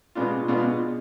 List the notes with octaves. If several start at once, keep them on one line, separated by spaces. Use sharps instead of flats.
B2 G#3 B3 D4 F4
B2 G#3 B3 D4 F4